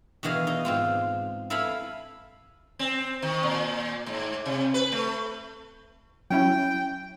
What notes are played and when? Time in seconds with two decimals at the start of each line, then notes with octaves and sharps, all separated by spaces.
0.23 B2 D#3 E3 G#4 F5
0.47 D#4
0.65 G#2 C4 F4
1.50 E4 A4 F5 G#5 B5
2.79 C4
3.22 D#3
3.43 A#2
4.06 G#2
4.46 C3
4.74 B4
4.92 A3
6.30 F#3 C#4 E4 G5